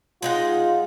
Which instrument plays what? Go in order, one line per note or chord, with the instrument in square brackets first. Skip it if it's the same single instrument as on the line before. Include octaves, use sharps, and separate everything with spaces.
[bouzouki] G#3 D#4 F#5 [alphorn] F4